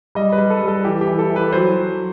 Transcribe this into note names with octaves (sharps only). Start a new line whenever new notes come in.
G3 D#5
B4
G3
A4
G3
A4
E3 G4
G4
E3
A4
E3
B4
F#3 C5
F#3